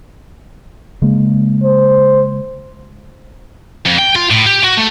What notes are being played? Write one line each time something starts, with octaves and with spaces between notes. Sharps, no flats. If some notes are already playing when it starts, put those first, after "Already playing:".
C#3 G#3 A#3
C5
F2
G5
F4
A2
G4
F#4
A3